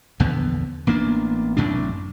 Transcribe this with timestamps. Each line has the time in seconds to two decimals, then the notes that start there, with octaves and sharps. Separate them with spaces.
0.20 A#1 E2 D3 B3
0.87 A1 A#3 B3 D4
1.57 A1 F#2 C3 D4